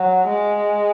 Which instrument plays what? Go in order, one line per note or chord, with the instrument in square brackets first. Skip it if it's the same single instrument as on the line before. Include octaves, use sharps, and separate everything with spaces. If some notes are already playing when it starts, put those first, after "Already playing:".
Already playing: [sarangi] F#3
G#3